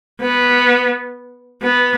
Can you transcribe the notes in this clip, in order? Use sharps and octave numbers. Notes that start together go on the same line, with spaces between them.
B3
B3